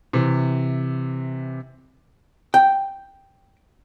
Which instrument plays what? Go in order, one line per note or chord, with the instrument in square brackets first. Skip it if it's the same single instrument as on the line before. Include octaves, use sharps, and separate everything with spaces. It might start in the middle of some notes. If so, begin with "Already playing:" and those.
[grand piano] C3 E3
[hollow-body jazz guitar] G5